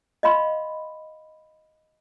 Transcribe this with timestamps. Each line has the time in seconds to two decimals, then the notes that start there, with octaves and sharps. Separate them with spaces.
0.23 D#5 F5 B5 C6